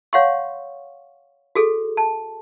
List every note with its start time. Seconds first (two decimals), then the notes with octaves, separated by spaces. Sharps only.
0.13 C#5 F5 F#5 C6 C#6
1.55 F#4 G#4 A4
1.97 A5